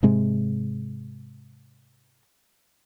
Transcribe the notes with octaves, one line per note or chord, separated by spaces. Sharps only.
G#2 C3 G#3